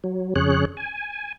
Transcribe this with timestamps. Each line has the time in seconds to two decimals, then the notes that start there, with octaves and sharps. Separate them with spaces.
0.04 F#3
0.36 F2 C#3 G#4 C#5 F#6
0.77 G#5